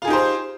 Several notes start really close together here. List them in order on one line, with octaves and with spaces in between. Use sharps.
F4 G#4 D#4 G4 C5